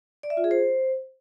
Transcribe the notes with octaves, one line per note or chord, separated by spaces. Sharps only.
D5
E5
F4
G#4
C5